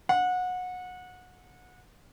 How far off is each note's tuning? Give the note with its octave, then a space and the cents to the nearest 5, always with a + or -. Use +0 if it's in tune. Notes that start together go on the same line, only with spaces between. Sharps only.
F#5 -25